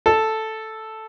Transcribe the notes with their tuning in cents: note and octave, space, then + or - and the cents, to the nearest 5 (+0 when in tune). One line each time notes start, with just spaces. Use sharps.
A4 +0 A5 +0